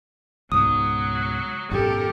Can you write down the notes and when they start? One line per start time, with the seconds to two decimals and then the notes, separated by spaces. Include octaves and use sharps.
0.52 C#2 G#2 B2 F#3 D#6
1.71 G#1 F#2 B2 G4 A4 A#4